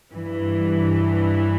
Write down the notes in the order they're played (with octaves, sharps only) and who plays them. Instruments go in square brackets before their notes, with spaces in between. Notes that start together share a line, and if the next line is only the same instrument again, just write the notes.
[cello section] G2 E3